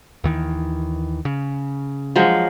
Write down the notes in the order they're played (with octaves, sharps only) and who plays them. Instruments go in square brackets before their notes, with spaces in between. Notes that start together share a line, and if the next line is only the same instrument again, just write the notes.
[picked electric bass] D#2 D#3 E3
C#3
[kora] F3 F#3 G#3